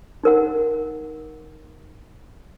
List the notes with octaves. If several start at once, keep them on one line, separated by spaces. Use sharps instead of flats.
D#4 A#4 F#5